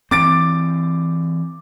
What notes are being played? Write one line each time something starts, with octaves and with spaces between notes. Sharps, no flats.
E3 C4 D6 A6 D7